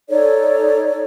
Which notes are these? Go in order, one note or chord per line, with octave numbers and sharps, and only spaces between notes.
D#4 A4 C#5 D5